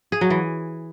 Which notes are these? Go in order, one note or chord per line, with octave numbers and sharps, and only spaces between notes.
G#4
F#3
E3